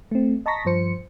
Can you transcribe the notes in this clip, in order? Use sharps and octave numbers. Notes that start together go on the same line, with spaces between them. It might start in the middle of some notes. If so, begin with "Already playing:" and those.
A3 C4
D#5 A5 A#5 C#6 A#6 B6
G2 F3 C5 C#7